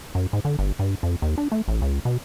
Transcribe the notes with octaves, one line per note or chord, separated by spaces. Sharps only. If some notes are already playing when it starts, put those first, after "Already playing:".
F#2
G#2
D3
G1
G2
F2
D#2
D4
A3
A1
C#2
B2